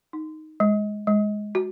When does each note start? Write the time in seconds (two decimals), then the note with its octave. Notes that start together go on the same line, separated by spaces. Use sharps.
0.13 D#4
0.60 G#3
1.07 G#3
1.55 F#4